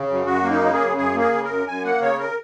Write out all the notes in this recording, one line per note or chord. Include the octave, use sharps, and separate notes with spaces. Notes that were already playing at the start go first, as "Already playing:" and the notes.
Already playing: C#3
F#2
F#2 F#4
A#3
D#4
C#3
G#4
F#2
F#2 G#4
A#3
G#4
C#3
F#2 A#4
F#2 G#5
A#3 F#5
C#3 C#5
A#4